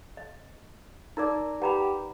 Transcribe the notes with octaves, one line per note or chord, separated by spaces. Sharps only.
D#5
D#4 A#4 D5 A#5 D6
G4 B4 F#5 A#5 B5